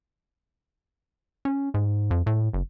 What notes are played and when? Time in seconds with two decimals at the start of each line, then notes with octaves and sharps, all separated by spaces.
1.45 C#4
1.74 G#2
2.11 F2
2.27 A2
2.53 F#1